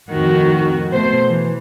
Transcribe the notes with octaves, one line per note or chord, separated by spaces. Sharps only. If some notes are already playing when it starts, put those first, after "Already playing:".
F2 A2 D#3 F#4
B2 A3 C5
E3